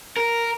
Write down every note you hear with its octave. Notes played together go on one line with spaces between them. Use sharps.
A#4